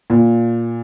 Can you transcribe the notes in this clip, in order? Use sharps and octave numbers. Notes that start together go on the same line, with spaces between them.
A#2